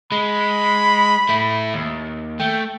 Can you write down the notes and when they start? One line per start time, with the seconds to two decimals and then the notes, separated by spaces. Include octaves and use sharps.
0.12 G#3 B5
1.29 A3 E4
1.74 D#2
2.40 A3 G5